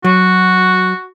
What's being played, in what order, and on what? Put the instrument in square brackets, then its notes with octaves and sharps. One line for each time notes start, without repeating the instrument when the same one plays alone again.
[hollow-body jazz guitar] F#3 [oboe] F#4